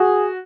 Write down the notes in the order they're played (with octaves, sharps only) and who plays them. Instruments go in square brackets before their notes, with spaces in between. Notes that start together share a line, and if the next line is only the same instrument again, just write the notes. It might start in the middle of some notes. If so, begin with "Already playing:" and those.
Already playing: [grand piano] F#4 [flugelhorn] G#4